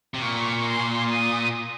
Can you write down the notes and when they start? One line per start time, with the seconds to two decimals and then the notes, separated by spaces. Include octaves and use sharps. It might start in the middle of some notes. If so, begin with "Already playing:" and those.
0.14 C3
0.22 A#2 C#6
0.66 C6
1.11 D#6